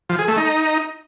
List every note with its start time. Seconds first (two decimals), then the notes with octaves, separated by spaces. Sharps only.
0.09 F3
0.19 G#4
0.28 A3
0.38 D#4